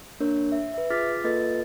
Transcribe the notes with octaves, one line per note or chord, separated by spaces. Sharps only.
A#3 D4 A#4 C#5
E5
B4 E5
F4 G#4 D6 F6 A6 B6
A#3 F4 A4 B4 D#5 A6